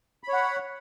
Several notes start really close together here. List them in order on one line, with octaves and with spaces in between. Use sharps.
B5 C#5 F#5